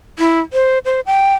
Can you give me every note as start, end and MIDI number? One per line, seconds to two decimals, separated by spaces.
0.19 0.40 64
0.53 0.79 72
0.85 1.01 72
1.06 1.35 79